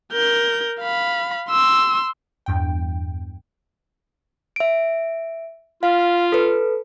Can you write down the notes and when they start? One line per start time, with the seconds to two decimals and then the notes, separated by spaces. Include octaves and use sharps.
0.13 A#4 G6
0.81 F5 B5
1.49 C6 E6
2.46 E2 G2 G5
4.56 E5 D7
5.83 F4 F5
6.32 A4 B4